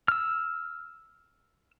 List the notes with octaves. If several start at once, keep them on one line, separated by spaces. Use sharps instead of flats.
E6 F6